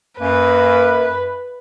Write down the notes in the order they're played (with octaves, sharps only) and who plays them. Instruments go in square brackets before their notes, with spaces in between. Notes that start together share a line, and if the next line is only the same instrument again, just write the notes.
[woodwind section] F#2 A#3 [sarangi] B4